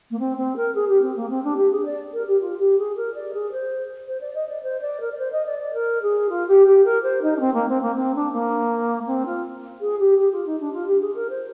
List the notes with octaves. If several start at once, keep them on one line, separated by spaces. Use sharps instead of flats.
A#3
C4
C4
A#4
G#4
G4
C4
A#3
C4
D4
G4
G#4
D5
A#4
G4
F4
G4
G#4
A#4
D5
G#4
C5
C5
D5
D#5
D5
C5
D5
A#4
D5
C5
D#5
D5
D5
A#4
G#4
F4
G4
G4
A#4
C5
D#4
D4
C4
A#3
C4
A#3
C4
D4
A#3
C4
F4
G#4
G4
G4
F4
D#4
D4
F4
G4
G#4
A#4
C5